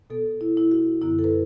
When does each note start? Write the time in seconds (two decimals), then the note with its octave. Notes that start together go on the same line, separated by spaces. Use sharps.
0.10 B2 B3 A4
0.41 E4
0.57 E4
0.71 F#4
1.02 F#2 D3 B3 E4
1.19 A4
1.24 B4